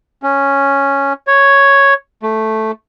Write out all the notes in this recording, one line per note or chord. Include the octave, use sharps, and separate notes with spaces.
C#4
C#5
A3